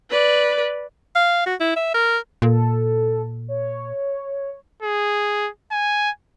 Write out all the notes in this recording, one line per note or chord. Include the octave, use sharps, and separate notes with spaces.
B4 D5
F5
F#4
E4
E5
A#4
A#2 A4
C#5
G#4
G#5